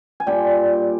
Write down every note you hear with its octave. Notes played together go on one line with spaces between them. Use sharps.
G#5
A#2 G3 D4 G5